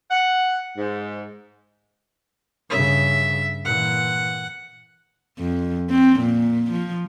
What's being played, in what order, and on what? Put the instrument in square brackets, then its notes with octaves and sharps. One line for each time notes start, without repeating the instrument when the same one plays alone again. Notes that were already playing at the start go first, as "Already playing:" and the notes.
[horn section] F#5
G#2
[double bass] G2 C#3 [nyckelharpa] E5
[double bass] A#2 E3 [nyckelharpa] F#5
[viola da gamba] F2
C4
A#2
F3